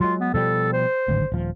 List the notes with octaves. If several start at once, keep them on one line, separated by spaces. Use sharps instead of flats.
F#3 G#3 F4
B3
B2 F3 G3 A4
C5
D1 G#1 D2
D#1 F3